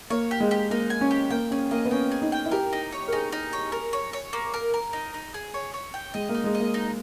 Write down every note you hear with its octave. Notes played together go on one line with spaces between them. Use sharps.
A#3 C#5
G4
G#3
G4
A#3 D#4
G#5
C#4
G4
A#3 G5
C#4 G#4
A#3 D#5
B3
C#4 G5
G#4
D#4
G5
E4
G4 A#4
D#4
C#5
A#4
D#4 G#4
D#4
C#5
A#4
C#5
C#5
A#3
A#4
A#4
D#4
D#4
G#4
C#5
C#5
G5
G#3 D#5
A#3
D#4
G#3
D#5
A#3
D#4